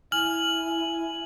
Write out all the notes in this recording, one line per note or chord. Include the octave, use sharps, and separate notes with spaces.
E4 G#5 F6 F#7